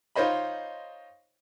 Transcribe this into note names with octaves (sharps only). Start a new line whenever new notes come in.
D#4 F4 C5 C#5 D#5 B5